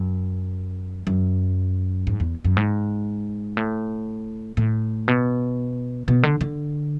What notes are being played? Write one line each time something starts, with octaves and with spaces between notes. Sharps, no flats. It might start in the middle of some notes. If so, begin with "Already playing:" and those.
Already playing: F#2
F#2
G#2
E2
F#2
G#2
A2
A2
B2
B2
D3
D3